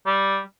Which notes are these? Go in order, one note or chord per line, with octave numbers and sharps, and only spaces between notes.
G3